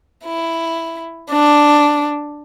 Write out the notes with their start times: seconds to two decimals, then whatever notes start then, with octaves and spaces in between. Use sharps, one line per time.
0.24 E4
1.30 D4